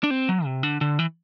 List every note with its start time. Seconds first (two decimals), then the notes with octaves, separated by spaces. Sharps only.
0.03 D4
0.11 C4
0.29 F#3
0.45 C3
0.63 D3
0.81 D3
0.99 E3